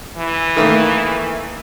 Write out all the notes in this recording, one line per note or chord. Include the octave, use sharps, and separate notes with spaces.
E3
D#3 A3 A#3